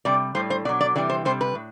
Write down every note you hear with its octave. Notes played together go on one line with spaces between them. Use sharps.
C3 G3 D5
A2 G3 C5
C5
B2 F#3 D5
D5
C3 E3 G3 D5
C5
C3 G3 C5
B4
A2